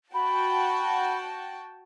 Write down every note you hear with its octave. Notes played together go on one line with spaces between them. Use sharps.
F#4 G5 A5 B5